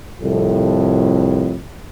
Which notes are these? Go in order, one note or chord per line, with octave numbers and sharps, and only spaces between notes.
C2 F2 A2